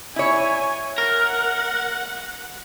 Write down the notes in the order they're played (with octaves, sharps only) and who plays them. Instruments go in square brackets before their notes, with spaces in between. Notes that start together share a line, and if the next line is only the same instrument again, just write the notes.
[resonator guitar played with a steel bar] E4 C#5 [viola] G#5
[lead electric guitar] A#4 [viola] F#5